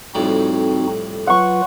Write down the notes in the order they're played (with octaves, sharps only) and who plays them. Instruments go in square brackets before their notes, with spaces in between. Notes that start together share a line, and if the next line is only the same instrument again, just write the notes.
[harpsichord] F2 A2 G3 [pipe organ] C4 D#4 F#4
[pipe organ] F#3 F4 B4 [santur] F#5 C#6